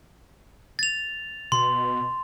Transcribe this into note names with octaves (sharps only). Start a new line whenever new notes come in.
A6 F7
B2 C6